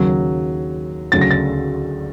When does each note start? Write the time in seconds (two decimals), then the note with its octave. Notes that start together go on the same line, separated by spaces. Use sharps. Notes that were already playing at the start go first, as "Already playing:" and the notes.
Already playing: D#2 C#3 F#3
1.12 D2 C#3 F#3 A6
1.21 A#6
1.31 A6